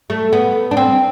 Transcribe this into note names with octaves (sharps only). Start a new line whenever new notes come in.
A3
B3
D4
C4